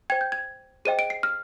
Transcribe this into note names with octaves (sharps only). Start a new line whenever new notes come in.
C5 G5 G#6
G6
G#6
G#4 C5 D#5 G5 D#7
D7
C7
F6